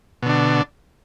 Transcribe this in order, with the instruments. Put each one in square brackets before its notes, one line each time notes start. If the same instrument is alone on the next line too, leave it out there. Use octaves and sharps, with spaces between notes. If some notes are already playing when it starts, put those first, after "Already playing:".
[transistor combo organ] B2
D3
D4